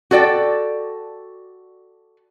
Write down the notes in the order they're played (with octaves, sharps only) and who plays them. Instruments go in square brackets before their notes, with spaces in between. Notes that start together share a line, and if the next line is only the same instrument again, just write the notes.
[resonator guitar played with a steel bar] F#4 A4 D5 G5